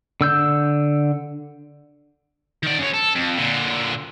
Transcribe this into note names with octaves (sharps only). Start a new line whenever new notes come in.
D3 E6 G6
D#3 D5
F#2 C#5
A4
F2
A#2 D3